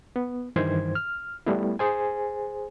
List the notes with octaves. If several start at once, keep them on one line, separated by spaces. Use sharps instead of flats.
B3
G2 D#3 E3 C5 G#6
F6
G3 A3 B3 E4
G#4 C5 G#5